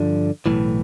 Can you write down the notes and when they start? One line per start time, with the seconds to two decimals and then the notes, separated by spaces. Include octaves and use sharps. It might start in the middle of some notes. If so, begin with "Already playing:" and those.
Already playing: G2 D3 F3 D4
0.46 B1 A2 E3